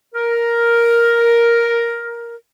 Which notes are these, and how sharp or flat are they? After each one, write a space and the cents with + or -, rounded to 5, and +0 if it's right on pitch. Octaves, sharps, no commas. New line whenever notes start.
A#4 +5